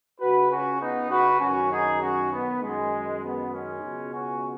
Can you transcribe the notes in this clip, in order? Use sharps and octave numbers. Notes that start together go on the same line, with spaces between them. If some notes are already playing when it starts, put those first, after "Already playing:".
C#2 C#3 F#4 B4
C#4 F#4
B3 D#4
F#4 B4
F#2 D#3 C#4 F#4
D#4 G#4
C#4 F#4
B3
F#2 D#3 G#3
B3
G#3 C#4
C#2 B2
C#4 F#4